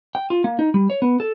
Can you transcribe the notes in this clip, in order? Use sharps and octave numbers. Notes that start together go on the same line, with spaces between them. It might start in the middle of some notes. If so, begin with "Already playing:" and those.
G5
F4
A#3
D#4
G3
C#5
B3
A4